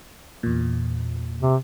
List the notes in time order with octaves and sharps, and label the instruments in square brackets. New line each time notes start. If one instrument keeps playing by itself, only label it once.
[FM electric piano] E2 A#2
[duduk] C3